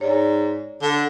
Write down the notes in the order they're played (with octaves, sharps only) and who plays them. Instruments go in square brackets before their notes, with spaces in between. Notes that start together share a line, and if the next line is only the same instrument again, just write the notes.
[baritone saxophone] G#2 [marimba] C#5 D5
[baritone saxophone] D3